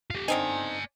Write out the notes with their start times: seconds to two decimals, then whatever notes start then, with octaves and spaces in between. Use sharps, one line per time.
0.11 F4 G4
0.28 D3 C4 D#4 D5 G#5